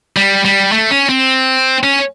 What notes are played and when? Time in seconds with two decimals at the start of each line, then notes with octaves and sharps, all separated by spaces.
0.17 G3
0.45 G3
0.72 A3
0.91 C#4
1.09 C4
1.83 C#4